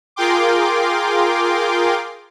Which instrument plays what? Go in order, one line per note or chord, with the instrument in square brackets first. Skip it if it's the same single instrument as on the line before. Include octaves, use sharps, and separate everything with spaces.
[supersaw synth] F4 G#4 A#4 G5 C6 D6